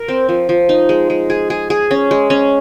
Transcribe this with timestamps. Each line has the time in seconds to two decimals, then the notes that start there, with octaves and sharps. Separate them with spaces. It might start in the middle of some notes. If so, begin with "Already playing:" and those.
Already playing: A#4
0.08 C4
0.29 F3
0.49 F3
0.69 D#4
0.89 G#3
1.10 G#3
1.30 G#4
1.50 G#4
1.70 G#4
1.91 C#4
2.11 G#3
2.30 C#4